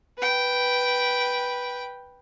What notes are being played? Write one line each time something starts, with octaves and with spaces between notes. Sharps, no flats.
B4 G5